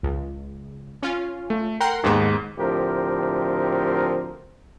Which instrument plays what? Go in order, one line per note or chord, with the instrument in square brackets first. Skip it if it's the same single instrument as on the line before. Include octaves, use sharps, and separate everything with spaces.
[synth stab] C#2
C#4 F4
[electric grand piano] A3
[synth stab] A#4 F#5 C6 [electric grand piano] G5 A#5
[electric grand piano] D#2 G#2 [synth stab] D#3 B3
[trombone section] D2 A2 F3 C4 G4 A#4